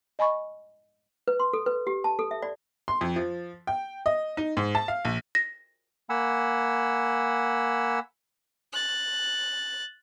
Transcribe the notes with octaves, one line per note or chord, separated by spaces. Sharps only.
D#5 G#5 B5 C#6
B4
C6
A4
B4
G4
A5
A4
E5
D5
C6
F2
F3
G5
D#5
D#4
G#2
A5
F5
A#1
A#6
A#3 F#5 G#5 B5 E6
F#6 A6